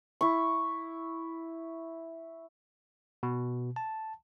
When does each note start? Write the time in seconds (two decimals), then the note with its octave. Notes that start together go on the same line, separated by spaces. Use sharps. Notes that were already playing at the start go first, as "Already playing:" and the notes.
0.21 E4 C#6
3.23 B2
3.76 A5